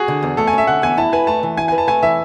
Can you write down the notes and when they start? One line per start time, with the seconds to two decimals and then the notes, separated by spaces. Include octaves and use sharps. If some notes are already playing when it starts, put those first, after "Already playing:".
Already playing: F#4 G#4
0.08 D3
0.23 E2
0.37 A3 A4
0.47 G#5
0.53 C#4 E5
0.67 D3 F#5
0.82 E2 G#5
0.97 E4 A5
1.13 B4 G#5
1.27 A3 A5
1.43 E3
1.57 E4 G#5
1.68 B4 G#5
1.78 A5
1.87 A3 G#5
2.02 E3 E5